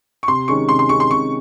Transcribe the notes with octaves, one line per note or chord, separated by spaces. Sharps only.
C#6
C3 C6
D#3 G#3 C#4 C#6
C3 C6
C6
D#3 G#3 C#4 C#6
C6
C3 C#6